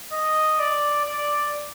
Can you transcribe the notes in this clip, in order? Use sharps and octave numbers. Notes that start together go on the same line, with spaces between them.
D#5
D5
D5